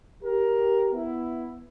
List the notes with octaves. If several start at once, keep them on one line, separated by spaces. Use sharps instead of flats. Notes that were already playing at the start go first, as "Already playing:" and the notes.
G4 A#4
B3 E4